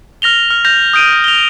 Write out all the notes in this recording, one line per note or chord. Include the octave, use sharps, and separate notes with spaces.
F6 A#6 F7 G7
F6
G6 A#6 F7
D#6 G6 D7 D#7
F7 G7